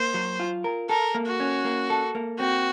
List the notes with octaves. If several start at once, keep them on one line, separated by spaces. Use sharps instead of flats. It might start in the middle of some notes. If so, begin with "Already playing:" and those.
Already playing: A#3 C5
F#3
F4
A#4
A4 A#4
A#3
F#4
C#4
A#3
A4
A#3
C4 F#4